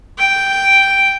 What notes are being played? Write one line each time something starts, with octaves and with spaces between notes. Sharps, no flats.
G5